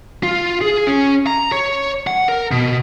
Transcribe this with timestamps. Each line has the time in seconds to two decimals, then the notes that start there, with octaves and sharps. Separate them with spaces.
0.23 F4
0.61 G#4
0.87 C#4
1.27 A#5
1.52 C#5
2.07 F#5
2.29 A#4
2.51 B2